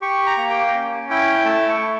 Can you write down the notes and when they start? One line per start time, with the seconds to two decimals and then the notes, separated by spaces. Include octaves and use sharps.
0.01 G4 C#6
0.27 A#5
0.38 A#3
0.50 G5
0.74 C#4
1.10 E4 G5
1.45 A3 A5
1.69 C#6
1.81 A3